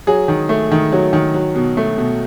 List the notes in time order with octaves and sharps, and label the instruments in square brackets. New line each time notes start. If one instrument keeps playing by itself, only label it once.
[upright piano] F#3 G#4
D#3
A3
D#3
F#3
D#3
F#3
B2
A3
B2